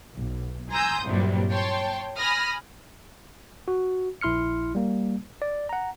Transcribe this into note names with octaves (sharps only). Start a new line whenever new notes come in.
B1
G#5 A#5 C6 D#6 E6 G6
C2 G2 A#2 F#3 G3
C#5 G5 A5 C6
G#5 B5 D#6 F6 A#6
F#4
A#1 E4 C6 F6 C#7
G3 A#3
D5
F#5 A#5